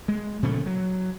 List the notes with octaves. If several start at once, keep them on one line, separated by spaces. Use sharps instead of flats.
G#3
A#2 C#3 F3 A3
F#3